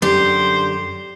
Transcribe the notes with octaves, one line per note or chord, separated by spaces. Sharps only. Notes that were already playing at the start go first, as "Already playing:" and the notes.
F#2 D3 G4 C5